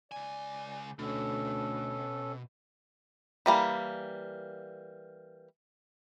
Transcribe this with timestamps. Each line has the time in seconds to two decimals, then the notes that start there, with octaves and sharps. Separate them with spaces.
0.12 C#2 D5 G#5
0.99 D2 B2 C#4 A4
3.46 E3 G3 A#3